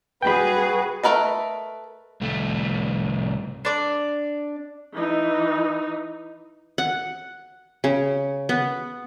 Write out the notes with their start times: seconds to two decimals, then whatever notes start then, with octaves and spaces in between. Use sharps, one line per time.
0.22 G3 F#4 G#4 B4 G5 B5
1.03 A3 F#4 A#4 B4 D#5
2.21 C2 A3
3.65 D4 D5 D6
4.93 E3 D#4
6.78 F#5
7.84 C#3
8.49 B3